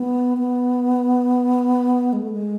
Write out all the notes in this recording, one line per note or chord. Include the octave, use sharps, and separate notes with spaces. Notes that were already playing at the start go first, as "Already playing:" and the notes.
Already playing: B3
B3
G#3
A3
G#3